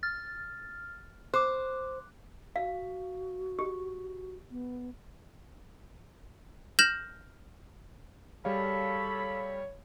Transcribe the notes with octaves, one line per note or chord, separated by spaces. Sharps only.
F6 A6
C5 D6 F#6
F#4 F5
G4
B3
F6 G6 A#6 E7 F#7
G3 G#4 A4 C#5 F5 B5